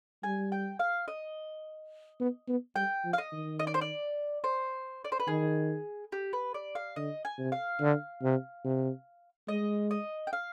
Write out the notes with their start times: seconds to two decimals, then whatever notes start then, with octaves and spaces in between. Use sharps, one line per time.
0.23 G3 G#5
0.52 G5
0.79 F5
1.08 D#5
2.20 B3
2.48 B3
2.76 G3 G5
3.04 F3
3.13 F5
3.18 D#5
3.32 D#3
3.59 D#5
3.67 D5
3.74 C5
3.81 D5
4.44 C5
5.05 D5
5.12 C5
5.20 B4
5.27 D#3 G#4
6.12 G4
6.33 B4
6.54 D5
6.75 F5
6.96 D3 D#5
7.25 G#5
7.39 C3
7.52 F5
7.81 D3
8.22 C3
8.64 C3
9.48 G#3 D#5
9.91 D#5
10.27 G5
10.33 F5